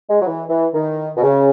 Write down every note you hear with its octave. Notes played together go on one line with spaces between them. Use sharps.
G#3
F#3
E3
E3
D#3
B2
C#3